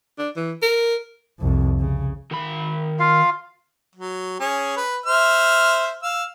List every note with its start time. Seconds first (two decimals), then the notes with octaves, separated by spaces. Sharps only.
0.18 D4
0.36 E3
0.62 A#4
1.39 C2 F2
1.79 C#3
2.31 D#3 B5
3.00 F4 F5
3.96 F#3
4.40 C#4 G#4
4.77 B4
5.06 C5 E5 F6
6.03 F5 E6